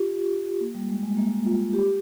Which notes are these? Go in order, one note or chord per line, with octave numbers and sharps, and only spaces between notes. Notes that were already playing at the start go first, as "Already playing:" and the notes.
Already playing: F4 G4
A#3
G3
G#3
G#3
A#3
F4
G4